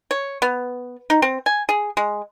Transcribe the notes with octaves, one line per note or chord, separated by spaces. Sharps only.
C#5
B3
D#4
C4
G#5
G#4
G#3